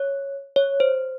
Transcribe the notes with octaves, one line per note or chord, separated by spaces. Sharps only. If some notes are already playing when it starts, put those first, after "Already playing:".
Already playing: C#5
C#5
C5